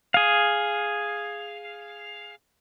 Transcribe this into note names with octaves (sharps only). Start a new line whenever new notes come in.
G#4 F5